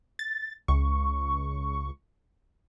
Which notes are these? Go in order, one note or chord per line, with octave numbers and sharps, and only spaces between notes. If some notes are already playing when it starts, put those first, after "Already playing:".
A6
C#2 C#6